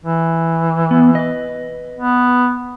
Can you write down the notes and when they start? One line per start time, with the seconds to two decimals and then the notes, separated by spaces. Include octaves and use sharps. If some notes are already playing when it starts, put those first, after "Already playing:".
0.05 E3
0.91 B3
1.15 B4 D#5
1.96 B3